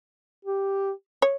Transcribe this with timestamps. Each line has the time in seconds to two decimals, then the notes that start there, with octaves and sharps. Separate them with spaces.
0.45 G4
1.22 C#5